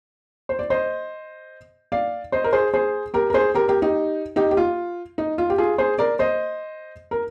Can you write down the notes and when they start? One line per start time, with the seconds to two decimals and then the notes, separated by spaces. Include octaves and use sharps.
0.49 C5
0.59 D5
0.70 C5 D#5
1.92 D5 F5
2.32 C5 D#5
2.44 A#4
2.53 G#4 C5
2.74 G#4 C5
3.14 G4 A#4
3.30 A#4
3.34 G#4 C5
3.55 G4 A#4
3.68 G4 A#4
3.82 D#4 G4
4.36 D#4 G4
4.51 G4
4.57 F4
5.18 D#4
5.38 F4
5.50 G4
5.58 F4 G#4
5.78 G#4 C5
5.98 A#4 D5
6.19 C5 D#5
7.11 A#4